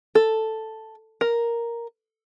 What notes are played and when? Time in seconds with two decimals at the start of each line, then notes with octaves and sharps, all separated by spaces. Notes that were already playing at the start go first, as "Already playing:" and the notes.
0.15 A4
1.21 A#4